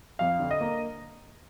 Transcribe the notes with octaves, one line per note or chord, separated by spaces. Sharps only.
F2 F5
D3
D#5
A#3